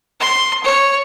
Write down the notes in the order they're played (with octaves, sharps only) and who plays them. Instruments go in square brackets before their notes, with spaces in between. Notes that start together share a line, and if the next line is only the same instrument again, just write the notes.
[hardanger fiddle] C6
C#5